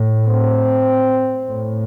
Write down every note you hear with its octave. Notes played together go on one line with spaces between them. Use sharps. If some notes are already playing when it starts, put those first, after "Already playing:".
Already playing: A2
C4
A2